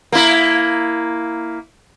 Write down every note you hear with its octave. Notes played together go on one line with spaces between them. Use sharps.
A#3 E4